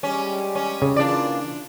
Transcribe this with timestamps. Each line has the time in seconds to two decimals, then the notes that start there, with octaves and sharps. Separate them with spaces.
0.03 G3 G#3 C#4 G4
0.55 C#4
0.82 C#3
0.96 E3 A#3 D4 F4 D5